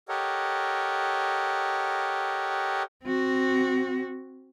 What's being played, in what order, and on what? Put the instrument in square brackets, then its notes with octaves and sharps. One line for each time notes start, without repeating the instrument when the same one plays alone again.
[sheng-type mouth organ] G4 A4 A#4 C#5 D#5 F#5
[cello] C4 F#4